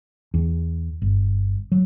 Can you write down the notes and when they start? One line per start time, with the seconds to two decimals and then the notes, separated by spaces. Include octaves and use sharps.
0.34 E2
1.02 G1
1.72 F#3